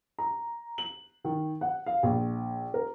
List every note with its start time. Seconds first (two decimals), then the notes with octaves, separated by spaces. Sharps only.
0.19 A#5
0.78 F#7
1.24 D#3
1.61 F#5
1.86 F5
2.03 A#1
2.74 A#4